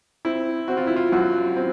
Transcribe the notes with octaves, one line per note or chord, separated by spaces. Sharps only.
C4 E4
C4 F#4
F4
E4
F4
F#2 F#4
C4